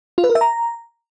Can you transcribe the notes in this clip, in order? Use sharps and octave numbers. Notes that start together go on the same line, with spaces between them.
F4
B4
A#4
E5
A#5